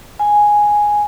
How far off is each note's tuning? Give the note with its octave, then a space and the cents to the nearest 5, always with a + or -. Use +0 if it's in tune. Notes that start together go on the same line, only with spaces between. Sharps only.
G#5 +0